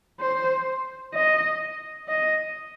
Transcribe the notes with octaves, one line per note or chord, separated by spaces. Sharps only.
C5
D#5
D#5